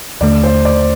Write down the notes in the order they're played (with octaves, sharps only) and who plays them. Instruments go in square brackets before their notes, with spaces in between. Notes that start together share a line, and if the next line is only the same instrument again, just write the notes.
[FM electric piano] D#2 D3 A3 [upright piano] D5
[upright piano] C5
D5